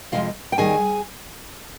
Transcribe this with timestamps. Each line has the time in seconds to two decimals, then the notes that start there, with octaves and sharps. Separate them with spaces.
0.12 F2 C3 F3 G#3 F4 F5
0.52 G5
0.58 D#2 D#3 G3 G#4 G#5